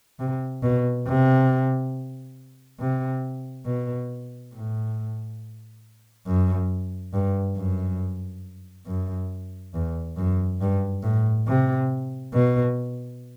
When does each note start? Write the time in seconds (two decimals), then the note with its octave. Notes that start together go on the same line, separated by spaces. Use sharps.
0.20 C3
0.63 B2
1.07 C3
2.80 C3
3.66 B2
4.54 A2
6.27 F#2
7.14 G2
7.57 F#2
8.87 F#2
9.74 E2
10.17 F#2
10.61 G2
11.04 A2
11.47 C3
12.34 B2